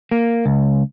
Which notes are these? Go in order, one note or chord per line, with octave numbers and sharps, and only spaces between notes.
A#3
C#2